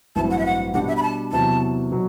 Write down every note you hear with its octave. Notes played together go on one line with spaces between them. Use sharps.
A1 G2 F#3 C4 E4 A5
F#5
E5
F#5
B2 G3 D4 G4 F#5
E5
B5
A5
E2 C3 F#3 B3 A5
B2 F#3